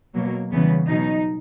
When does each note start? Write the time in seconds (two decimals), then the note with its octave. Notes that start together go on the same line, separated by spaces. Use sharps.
0.14 B2 F#3 A#3
0.51 E2 C#3 E3 G3 B3
0.88 B2 F#3 D#4